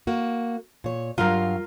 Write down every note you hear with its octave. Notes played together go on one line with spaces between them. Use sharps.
A#3 F#4
A#2 C#5
G2 F#3 F4 A#4 F5